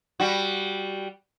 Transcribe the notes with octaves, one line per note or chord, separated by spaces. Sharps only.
G3 F#4